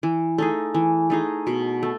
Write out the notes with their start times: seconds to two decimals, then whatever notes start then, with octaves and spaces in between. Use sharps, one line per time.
0.03 E3
0.38 A3 D#4 G#4
0.74 E3
1.10 A3 D#4 G#4
1.47 B2
1.83 A3